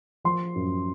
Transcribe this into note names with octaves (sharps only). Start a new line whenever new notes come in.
F3 C6
F#2